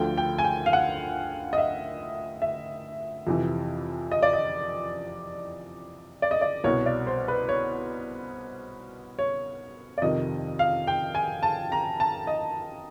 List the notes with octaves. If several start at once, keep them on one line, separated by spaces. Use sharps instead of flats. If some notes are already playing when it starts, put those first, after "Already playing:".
Already playing: D2 D3 F3 G5
G5
G#5
G5
F5
F#5
D#5
E5
E5
F2 C3 E3
D#5
D5
D#5
D5
D#5
D5
C2 B2 C#5
D5
C5
B4
C#5
C#5
D5
F2 C3 D#3 D#5
F5
G5
G#5
A5
A#5
A5
D#5